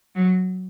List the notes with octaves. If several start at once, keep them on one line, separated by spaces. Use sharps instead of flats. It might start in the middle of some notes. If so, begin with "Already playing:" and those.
F#3